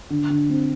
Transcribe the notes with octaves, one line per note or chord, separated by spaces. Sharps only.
D3
D3
C4